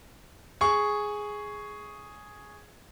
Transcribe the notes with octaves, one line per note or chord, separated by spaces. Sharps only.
G#4 C#6